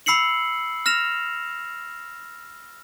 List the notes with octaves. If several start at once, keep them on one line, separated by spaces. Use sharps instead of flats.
B5 E6 C7 C#7 F#7
F6 A#6 E7 F7